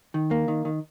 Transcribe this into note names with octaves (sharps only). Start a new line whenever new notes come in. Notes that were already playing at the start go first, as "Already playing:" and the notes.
D#3
A#3
D#3
D#3